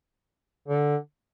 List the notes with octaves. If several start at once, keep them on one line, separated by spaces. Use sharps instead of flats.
D3